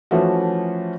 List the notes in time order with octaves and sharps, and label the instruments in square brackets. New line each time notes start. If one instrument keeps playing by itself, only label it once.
[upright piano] E3 F3 A3 C#4 F#4